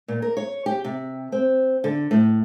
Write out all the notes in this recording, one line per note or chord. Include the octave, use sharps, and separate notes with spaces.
A#2
A#4
C#5
G4
C3
C4
D3
A2